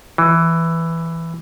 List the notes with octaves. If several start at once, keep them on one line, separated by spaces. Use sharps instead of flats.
E3